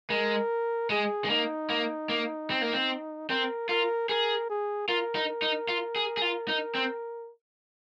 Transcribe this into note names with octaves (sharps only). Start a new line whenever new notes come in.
G#3 A#4
G#3 G#4
G#3
A#3 D#4
A#3
A#3
C4
A#3
C4
C4 A#4
F4 A#4
G#4 A#4
G#4
F4 A#4
D#4
A#4
D#4
F4
G#4
G#4
F4
D#4 A#4
C4